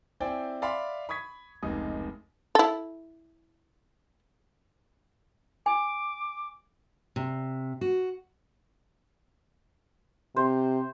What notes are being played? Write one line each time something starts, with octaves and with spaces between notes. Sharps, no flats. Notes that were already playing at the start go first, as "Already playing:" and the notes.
C4 E4 C5 D5 G5 G#5
D5 E5 F5 B5 C6
B5 C#6 D#6 G#6 B6
F1 C#2 D#4 D#6
E4 A4
G#5 D6
C3
F#4
C3 C5